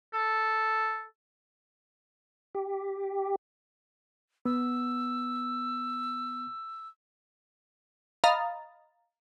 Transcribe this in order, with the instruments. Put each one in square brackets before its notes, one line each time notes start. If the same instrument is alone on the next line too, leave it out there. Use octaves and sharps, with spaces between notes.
[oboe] A4
[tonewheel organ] G4
[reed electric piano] B3 [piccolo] E6
[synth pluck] D#5 F5 A#5 B5 D#6 A6